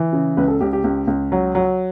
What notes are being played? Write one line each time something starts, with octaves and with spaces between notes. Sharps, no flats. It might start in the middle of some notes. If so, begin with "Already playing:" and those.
Already playing: E3
C#3
C#2 B4
A4
C#2 G4
G4
C#2
C#2
F#3
F#3